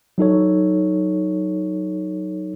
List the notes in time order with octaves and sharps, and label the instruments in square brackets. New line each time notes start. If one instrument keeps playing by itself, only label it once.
[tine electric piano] F#3 D#4 A4 C#5